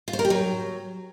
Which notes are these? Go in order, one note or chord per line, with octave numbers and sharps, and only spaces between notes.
F4
C5
A#4
G4
F#3